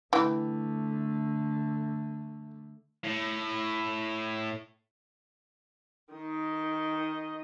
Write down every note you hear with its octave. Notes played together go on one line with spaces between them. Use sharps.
D3 E3 A3 G5
A2
D#3 D#5